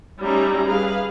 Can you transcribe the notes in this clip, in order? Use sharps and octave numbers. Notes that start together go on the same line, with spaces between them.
G3 C#4 D#4 E5 A#5
G#4 B4 F5